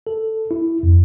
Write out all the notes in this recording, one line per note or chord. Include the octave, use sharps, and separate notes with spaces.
A4
E4
F2